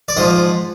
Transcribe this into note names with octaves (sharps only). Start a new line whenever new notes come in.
D5
G#2 F3 D#5